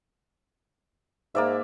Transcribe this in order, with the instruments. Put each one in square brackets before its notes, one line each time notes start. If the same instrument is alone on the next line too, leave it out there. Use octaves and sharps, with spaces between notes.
[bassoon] G#2 [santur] A#3 D5 E5